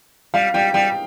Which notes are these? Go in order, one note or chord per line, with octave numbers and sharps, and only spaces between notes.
G3 F5
G3 G5
G3 G5